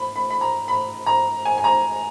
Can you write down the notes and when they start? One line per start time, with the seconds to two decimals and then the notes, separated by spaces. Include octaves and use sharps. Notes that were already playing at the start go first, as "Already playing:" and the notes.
Already playing: B5
0.16 B5
0.30 B5
0.41 A#5
0.68 B5
1.06 A#5
1.45 G#5
1.58 G#5
1.64 A#5